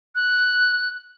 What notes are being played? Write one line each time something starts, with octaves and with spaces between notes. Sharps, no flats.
F#6